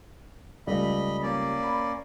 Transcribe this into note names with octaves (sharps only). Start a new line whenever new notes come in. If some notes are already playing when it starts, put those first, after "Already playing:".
C#2 G3 A3 D#5 B5
A#3 C#4 D5
B5